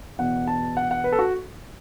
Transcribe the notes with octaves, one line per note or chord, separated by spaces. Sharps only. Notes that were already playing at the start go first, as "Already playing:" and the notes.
E2 B2 F#5
A5
F#5
F#5
B4
A4
F#4